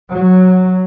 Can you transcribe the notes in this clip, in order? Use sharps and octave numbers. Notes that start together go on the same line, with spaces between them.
F#3